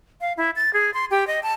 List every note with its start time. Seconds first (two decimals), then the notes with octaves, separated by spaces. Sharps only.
0.21 F5
0.37 E4
0.56 A6
0.73 G#4
0.94 C6
1.11 G4
1.27 D#5
1.43 A5